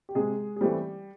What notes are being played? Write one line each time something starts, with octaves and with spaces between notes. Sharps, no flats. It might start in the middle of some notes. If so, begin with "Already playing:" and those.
G4
C3 G#3 G#4
G#4
E3 G3 A3 C4 G4